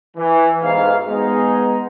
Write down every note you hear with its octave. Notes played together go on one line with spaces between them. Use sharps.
E3
B1 G#2 F5
G#3 B3 D#4